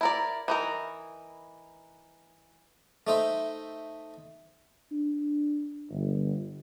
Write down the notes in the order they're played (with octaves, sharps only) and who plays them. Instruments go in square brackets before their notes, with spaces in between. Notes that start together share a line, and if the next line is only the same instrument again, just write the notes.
[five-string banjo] E4 A#4 D5
E3 D#4 A#4
[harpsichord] A3 D#4 C5 E5
[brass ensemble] D4
G1